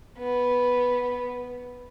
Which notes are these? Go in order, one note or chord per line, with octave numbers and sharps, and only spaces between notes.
B3